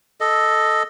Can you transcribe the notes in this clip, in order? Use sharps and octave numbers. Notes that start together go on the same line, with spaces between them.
A4 D#5